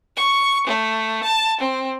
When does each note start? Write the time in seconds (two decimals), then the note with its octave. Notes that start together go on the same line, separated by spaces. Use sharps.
0.16 C#6
0.68 A3
1.23 A5
1.60 C4